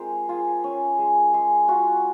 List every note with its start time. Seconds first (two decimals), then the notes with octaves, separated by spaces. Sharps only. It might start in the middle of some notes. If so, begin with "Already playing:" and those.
Already playing: G#3 C4 F4 A#4 C5
0.29 F4 G#4
0.64 C#4
0.99 G#3
1.34 G#3
1.68 F4 F#4